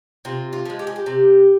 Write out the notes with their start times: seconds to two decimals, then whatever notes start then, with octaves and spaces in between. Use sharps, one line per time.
0.25 C3 F4
0.53 F4
0.66 F3 G#3
0.79 G4
0.87 G#4
0.96 G4
1.06 C3